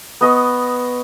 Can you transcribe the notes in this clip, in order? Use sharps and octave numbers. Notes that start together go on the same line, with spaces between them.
B3 D#5 C#6